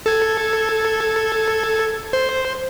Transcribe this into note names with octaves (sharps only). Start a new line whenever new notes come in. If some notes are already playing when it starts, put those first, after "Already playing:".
A4 G#6
C5